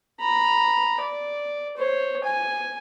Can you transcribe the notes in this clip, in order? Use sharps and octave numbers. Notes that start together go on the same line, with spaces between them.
A#5 B5
D5
C5 C#5
G#5